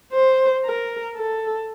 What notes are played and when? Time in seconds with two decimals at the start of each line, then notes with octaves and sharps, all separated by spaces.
0.13 C5
0.65 A#4
1.16 A4